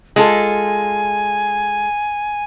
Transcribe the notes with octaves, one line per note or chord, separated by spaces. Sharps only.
G#3 F4 A4 G#5